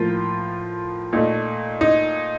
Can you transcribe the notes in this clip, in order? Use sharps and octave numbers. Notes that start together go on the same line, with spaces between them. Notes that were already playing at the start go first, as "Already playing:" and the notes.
Already playing: A2 F3 A#3 F4
A#2 A3 D#4
D#4